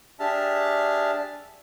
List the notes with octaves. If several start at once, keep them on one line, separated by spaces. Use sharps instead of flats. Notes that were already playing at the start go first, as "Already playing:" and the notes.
D4 G4 G#4 E5 A5 F6